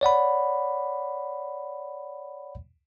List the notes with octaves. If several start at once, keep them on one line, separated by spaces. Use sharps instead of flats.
C#5 D5 F#5 B5